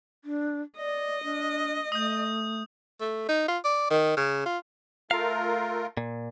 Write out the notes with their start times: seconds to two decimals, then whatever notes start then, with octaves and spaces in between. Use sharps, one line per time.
0.25 D4
0.77 D5 D#5
1.24 D4
1.92 A3 D#6 G6
3.01 A3
3.29 D#4
3.48 F4
3.64 D5
3.90 D#3
4.17 C#3
4.46 F4
5.11 A3 F4 A#4 F5
5.97 A#2